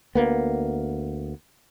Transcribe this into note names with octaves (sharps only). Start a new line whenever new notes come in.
D2 A#3 B3